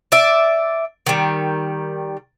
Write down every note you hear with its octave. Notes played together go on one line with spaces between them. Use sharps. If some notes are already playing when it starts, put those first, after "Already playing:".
D5 E5
D#3 G3